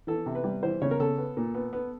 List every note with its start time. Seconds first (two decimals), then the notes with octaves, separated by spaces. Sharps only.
0.07 E3 A4
0.26 C3
0.35 B4
0.44 G3
0.63 E3 C5
0.82 C#3 C#5
0.91 A#4
0.99 C#3 A4
1.18 B3
1.37 A#2
1.54 B3
1.73 B3